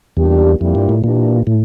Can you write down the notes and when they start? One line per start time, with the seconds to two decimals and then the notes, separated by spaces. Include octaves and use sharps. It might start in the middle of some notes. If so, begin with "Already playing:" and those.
0.17 E2 A#2 G3 D4 G4
0.60 F2 A#2 G3 A#3 E4 G4
0.75 G2
0.89 A2
1.03 A#2 E3 A#3 D4 G4
1.47 A2